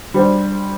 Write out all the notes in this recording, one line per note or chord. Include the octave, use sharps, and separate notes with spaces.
G3 D4 G4 C5